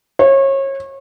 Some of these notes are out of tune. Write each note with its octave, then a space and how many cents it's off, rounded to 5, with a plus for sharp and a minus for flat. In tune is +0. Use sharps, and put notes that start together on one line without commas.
C#5 -30